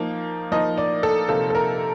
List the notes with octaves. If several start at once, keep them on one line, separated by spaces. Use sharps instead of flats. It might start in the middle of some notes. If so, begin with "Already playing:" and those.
Already playing: F3 A#3 D#4
F3 A#3 D#4 D#5
D5
A4
C3 F3 A#3 D#4 A4
A4
A#4